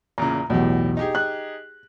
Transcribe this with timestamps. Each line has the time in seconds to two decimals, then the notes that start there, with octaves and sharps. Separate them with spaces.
0.18 E2 A#2 C#3 A#5
0.50 B1 E2 A2 G4
0.97 D#4 G4 G#4
1.15 F#6